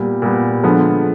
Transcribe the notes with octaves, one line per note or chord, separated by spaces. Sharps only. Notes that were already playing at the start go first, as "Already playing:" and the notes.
Already playing: A#2 G3 B3
A#2 G3 B3
D3 F3 G#3 B3